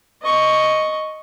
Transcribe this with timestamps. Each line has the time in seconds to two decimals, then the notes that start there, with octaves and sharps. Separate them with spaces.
0.22 D#5 C#6